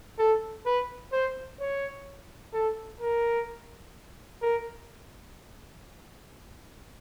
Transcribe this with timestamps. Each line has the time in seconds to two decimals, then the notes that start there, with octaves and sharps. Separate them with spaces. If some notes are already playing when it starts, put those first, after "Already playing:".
0.19 A4
0.66 B4
1.12 C5
1.60 C#5
2.54 A4
3.00 A#4
4.42 A#4